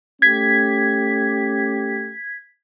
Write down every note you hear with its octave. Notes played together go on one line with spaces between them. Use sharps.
A3 C#4 G4 G#6 B6